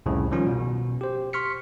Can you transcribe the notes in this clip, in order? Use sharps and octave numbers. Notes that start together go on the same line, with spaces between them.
C2 F2 A2 C#3
D#3 F3 G3 C#4 F4
B2
G4 C5
C6 C#6 F6 B6 C#7